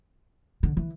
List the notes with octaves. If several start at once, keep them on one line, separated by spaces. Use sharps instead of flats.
D3
E3